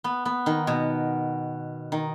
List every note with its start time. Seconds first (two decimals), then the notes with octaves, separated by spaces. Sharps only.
0.04 B3
0.25 B3
0.46 D#3
0.67 B2
1.92 D#3